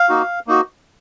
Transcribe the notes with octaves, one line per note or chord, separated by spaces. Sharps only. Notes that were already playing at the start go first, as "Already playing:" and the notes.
Already playing: F5
A#3 D#4 F#4
A#3 D#4 F#4